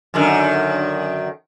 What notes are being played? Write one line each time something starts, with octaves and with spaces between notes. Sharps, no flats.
F#2 D3 D#3